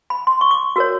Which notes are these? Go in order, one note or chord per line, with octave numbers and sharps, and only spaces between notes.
B5
C6
C#6
D6
F#4 A#4 C#5 E6